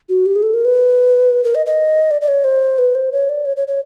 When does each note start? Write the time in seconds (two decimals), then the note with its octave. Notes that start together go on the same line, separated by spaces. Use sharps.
0.09 F#4
0.26 G4
0.36 G#4
0.43 A4
0.54 A#4
0.65 B4
1.44 A#4
1.55 D#5
1.66 D#5
2.11 D5
2.21 D5
2.28 C#5
2.44 C5
2.79 B4
2.95 C5
3.12 C#5
3.29 D5
3.45 C#5
3.57 C#5
3.68 C#5